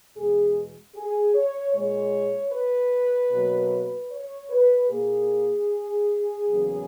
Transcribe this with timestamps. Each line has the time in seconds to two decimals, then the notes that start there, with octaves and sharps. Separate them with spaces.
0.15 E2 B2 G#3 G#4
0.95 G#4
1.34 C#5
1.74 A#2 G#3 C#5
2.52 B4
3.31 B2 F#3 A#3
4.10 C#5
4.50 B4
4.89 A#2 A#3 G#4
6.48 E2 C#3 F#3 A#3